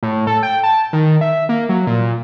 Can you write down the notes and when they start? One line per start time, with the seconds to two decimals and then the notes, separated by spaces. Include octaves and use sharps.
0.03 A2
0.27 A4
0.43 G5
0.64 A5
0.93 D#3
1.21 E5
1.49 A#3
1.69 F#3
1.87 A#2